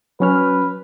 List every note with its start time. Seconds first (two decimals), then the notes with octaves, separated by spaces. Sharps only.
0.20 F#3 C#4 B4 F6